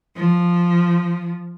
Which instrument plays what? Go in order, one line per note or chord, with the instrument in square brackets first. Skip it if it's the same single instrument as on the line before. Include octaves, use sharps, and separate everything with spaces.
[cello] F3